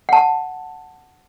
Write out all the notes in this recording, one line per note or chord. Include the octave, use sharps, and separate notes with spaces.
F#5 A5